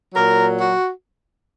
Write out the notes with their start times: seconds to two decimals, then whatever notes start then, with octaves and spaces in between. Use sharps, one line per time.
0.14 A#2 F#3 A#4
0.57 F#4